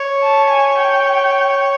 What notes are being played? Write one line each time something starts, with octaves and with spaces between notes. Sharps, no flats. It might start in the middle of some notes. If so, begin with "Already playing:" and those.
Already playing: C#5
A5
G#5
G5